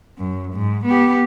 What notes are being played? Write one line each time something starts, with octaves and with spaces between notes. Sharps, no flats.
F#2
G#2
B3 G4